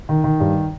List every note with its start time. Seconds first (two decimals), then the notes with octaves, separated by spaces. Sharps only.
0.09 D#3
0.24 D#3
0.40 G2